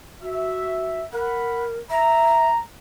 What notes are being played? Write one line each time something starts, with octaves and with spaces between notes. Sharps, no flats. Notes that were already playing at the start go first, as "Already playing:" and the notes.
F#4 E5
A#4 F#5 B5
E5 A#5